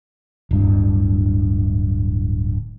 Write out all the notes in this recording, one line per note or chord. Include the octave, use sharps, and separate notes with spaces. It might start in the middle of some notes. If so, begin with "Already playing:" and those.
D1 G2